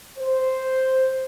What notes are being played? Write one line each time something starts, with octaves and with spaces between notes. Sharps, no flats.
C5